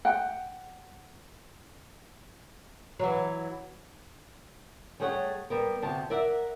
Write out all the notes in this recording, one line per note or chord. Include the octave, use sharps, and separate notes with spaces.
F#5 G5
E3 F#3
G3 A3 G#4 C#5 F#5
G3 B3 A#4
D2 C3 A5
A#4 D5 E5 F#5